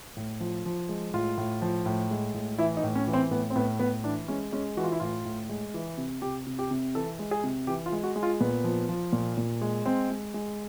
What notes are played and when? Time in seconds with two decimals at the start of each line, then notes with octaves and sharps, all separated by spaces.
0.17 A2
0.40 F3
0.66 F3
0.89 G#3
1.14 A2 F4
1.37 A2
1.62 F3
1.86 A2
2.11 G#3
2.34 A2
2.58 E3 E4
2.77 D#4
2.83 A2
2.95 C#4
3.07 E3
3.13 C4
3.31 A2 B3
3.50 C4
3.55 A2 B3
3.79 A2 B3
4.04 E3 D4
4.28 G#3 C#4
4.53 G#3 C#4
4.77 E3 F#4
4.84 F4
4.92 E4
5.00 A2 F4
5.25 A2
5.49 G#3
5.74 E3
5.98 C3
6.22 C3 G4
6.47 C3
6.59 G4
6.71 C3
6.95 E3 A4
7.19 G#3
7.31 G#4
7.44 C3
7.67 E3 G4
7.86 F4
7.92 G#3
8.04 F#4
8.16 G#3
8.23 F4
8.40 A#2 B3
8.64 F3
8.89 F3
9.13 A#2
9.38 A#2
9.62 G#3
9.86 G#3 C4
10.10 G#3
10.34 G#3